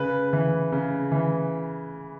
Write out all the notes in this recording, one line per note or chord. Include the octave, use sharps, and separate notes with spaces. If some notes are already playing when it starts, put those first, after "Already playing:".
Already playing: C#3 B4
E3
C#3
E3